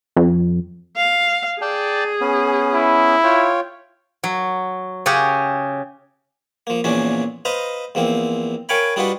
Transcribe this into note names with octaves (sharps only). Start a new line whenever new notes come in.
F2
F5
G#4 D5 G5 A5
B3 C#4
E4
F4 C#5 G5
F#3
C#3 C#4 G4 F#5
F3 A#3
E2 A#2 F3 A#3 C#4 D4
B4 C5 D#5 F5 A#5
E2 F3 A#3 C4
A#4 C#5 F5 G5 G#5 B5
G3 D4 D#4 F4 F#4 B4